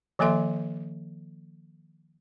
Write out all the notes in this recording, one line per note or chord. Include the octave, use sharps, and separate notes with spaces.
D#3 F3 A#3 A4 E5 C6